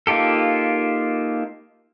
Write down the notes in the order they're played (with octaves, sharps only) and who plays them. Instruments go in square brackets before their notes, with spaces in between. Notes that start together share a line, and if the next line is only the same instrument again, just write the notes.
[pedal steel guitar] A#3 D#4 F4 G4 A4